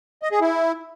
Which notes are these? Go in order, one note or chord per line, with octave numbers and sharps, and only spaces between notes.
D#5
G#4
E4